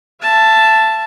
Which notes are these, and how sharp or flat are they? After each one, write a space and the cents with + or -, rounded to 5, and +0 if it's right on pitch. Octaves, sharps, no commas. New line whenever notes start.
E5 +35 A5 +0